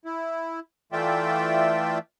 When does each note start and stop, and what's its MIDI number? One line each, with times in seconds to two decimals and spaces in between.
0.05 0.60 64
0.92 1.98 52
0.92 1.98 57
0.92 1.98 65
0.92 1.98 74
0.92 1.98 76
0.92 1.98 79